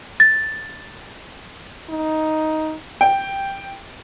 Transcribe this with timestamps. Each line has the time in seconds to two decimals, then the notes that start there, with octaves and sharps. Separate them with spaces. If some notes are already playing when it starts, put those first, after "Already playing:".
0.20 A6
1.89 D#4
3.01 G5